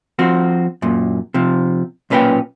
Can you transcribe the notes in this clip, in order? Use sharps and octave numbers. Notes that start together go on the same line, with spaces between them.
F3 C4 F#4
F#2 A#2
C3 F3
B1 A#2 C#4 B4 C#5 G5